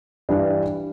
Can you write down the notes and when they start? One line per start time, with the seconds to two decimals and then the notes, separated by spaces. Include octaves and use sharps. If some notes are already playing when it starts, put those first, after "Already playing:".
0.29 G2 E3 G3 D4